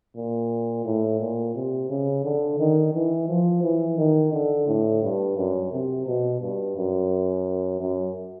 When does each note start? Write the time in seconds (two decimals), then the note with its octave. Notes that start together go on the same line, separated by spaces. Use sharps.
0.16 A#2
0.85 A2
1.20 A#2
1.55 C3
1.90 C#3
2.25 D3
2.59 D#3
2.94 E3
3.29 F3
3.63 E3
3.98 D#3
4.33 D3
4.67 A2
5.03 G2
5.37 F#2
5.72 C3
6.06 B2
6.41 G2
6.76 F#2
7.80 F#2